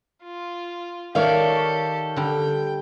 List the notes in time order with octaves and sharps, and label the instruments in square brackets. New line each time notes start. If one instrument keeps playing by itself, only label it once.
[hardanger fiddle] F4
[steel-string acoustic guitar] D#3 C#5 D5 [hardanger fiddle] G4 A4 [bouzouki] A#4 E5 F5
[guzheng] D3 G3 [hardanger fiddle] G5